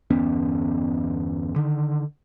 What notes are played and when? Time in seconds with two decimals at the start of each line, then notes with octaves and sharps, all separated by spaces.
0.11 G1 E2 B3 C#4
1.56 D3 D#3